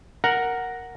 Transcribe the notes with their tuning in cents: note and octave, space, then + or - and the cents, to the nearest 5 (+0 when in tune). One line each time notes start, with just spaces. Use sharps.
A#4 +0 F#5 +0